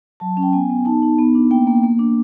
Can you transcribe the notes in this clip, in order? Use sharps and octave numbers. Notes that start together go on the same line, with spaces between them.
F#3 A5
C#4
G5
B3 G#5
B3
D#4 A5
D#4
B3
D4
A#3 G5
A#3
A#3
D4